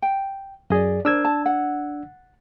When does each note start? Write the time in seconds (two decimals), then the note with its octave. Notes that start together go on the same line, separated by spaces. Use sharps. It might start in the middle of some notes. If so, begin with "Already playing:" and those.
0.02 G5
0.70 F#2 G#4 D5 D#5
1.05 D4 A#4 C5 E6 G#6
1.25 A5
1.46 F#5